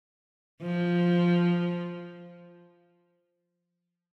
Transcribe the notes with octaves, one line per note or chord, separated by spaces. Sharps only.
F3